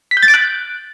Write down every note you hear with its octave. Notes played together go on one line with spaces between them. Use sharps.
B6
G6
A6
D7
F#6